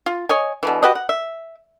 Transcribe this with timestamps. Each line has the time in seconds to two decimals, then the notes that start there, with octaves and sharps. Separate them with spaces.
0.06 F4
0.29 C#5 D#5 G#5
0.63 B2 D3 E3
0.83 F#4 G4 B4 D#5
0.95 F#5
1.09 E5